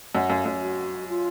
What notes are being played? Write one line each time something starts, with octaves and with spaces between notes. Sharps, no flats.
F#2 F#5
F#2 F5
F#2
F#4
F4